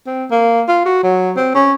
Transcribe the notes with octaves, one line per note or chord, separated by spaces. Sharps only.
C4
A#3
F4
F#4
F#3
C4
C#4